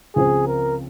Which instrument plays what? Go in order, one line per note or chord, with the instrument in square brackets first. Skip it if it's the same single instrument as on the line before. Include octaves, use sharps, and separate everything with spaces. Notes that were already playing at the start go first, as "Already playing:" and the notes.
[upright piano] C#2 C#3 F3 C4 [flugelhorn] G#4
[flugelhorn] A#4